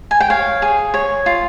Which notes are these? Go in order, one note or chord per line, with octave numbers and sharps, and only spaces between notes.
G#5
G5
C#5 F5
G#4
C#5
F4